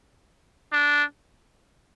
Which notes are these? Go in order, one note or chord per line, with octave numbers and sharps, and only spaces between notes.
D4